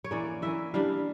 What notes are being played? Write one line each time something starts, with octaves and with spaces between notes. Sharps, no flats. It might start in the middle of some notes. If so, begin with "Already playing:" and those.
C#5
E3 A#3 C#4 D5
E3 A#3 C#4 E5
E3 G3 D4 F5